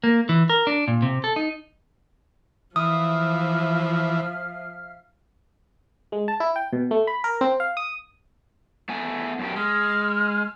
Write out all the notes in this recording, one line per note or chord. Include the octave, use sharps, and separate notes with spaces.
A#3
E3
A#4
D4
A#2
C3
A4
D#4
E3 F3 E5 F5 D#6 F6
G#3
A5
E4
G5
B2
A3
B5
A#4
C4
F5
D#6
A3 B3 G#5
F#2 B2 G4
G#3 F6